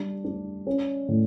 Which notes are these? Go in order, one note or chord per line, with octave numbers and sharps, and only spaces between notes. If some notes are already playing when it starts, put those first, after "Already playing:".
Already playing: G3 D4
D4
C#4
A2